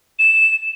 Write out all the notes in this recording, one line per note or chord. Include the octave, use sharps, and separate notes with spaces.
E7